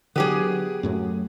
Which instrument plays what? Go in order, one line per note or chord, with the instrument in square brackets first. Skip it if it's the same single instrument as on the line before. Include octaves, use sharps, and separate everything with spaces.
[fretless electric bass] D3 F#3 [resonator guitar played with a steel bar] B3 G4 G#4
[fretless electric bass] F#2 A2 F#3